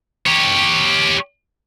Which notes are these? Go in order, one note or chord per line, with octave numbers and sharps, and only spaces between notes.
G4 C#5